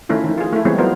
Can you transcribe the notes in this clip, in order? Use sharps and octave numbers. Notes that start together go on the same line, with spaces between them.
D#3 A3 C#4 E4 F4
D#3 F3
F4 G#4
A3 E4
E3 G3 G#3 B3 C4 C#5
F#3 B3 F4 A#4 C5